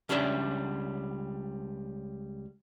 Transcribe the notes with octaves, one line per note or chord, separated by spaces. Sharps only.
C#2 G3 C#4 D4 D5 E5